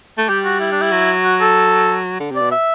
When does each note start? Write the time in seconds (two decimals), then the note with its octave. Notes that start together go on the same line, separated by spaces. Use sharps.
0.18 A3
0.28 G3 G4
0.45 F#4
0.60 E4
0.72 D4
0.81 E4
0.92 F#3
1.24 F#4
1.41 A4
2.20 D3
2.30 C3
2.36 D5
2.41 B2
2.52 E5